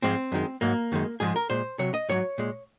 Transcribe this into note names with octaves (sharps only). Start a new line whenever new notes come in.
G#2 F3 G#3 C4
F#2 D#3 G#3
G#2 F#3 A#3
F#2 D#3 G#3
G#2 F3 G#3 G#4
A#4
A#2 G#3 C5
C3 F#3 C#5
D#5
G#2 F#3 C#5
A#2 G#3